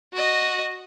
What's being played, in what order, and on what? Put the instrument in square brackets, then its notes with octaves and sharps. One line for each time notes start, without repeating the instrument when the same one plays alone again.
[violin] F#4 D#5